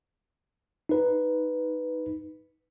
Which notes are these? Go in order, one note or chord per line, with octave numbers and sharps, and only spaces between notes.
D#4 B4